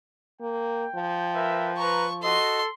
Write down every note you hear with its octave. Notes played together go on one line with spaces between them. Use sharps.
A#3 G5
F3
A#4 B4 E5
B4 A#5 C#6
F#4 A4 D#5 C6